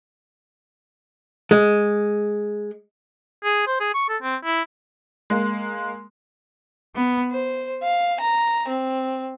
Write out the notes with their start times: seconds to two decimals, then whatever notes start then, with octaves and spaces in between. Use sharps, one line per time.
1.51 G#3
3.44 G#4
3.67 C5
3.80 G#4
3.94 C#6
4.09 A4
4.22 C4
4.44 E4
5.30 G#3 A#3
6.96 B3
7.33 C5
7.84 F5
8.21 A#5
8.68 C4